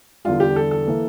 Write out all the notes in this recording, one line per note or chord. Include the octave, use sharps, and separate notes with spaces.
E2 D3 G3 F4
G4
A4
A4
E3 A#3